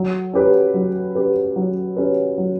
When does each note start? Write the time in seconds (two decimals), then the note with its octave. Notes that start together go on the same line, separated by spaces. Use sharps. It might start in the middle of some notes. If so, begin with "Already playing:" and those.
Already playing: F#3
0.33 C#4 G4 B4
0.74 F#3
1.15 C#4 G4 B4
1.56 F#3
1.96 C#4 G4 B4
2.38 F#3